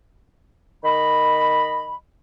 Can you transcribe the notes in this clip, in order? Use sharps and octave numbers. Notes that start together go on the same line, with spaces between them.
D#3 D#5 B5